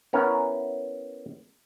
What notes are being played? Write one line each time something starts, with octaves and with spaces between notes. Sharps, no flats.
B3 C#4 E4 A#4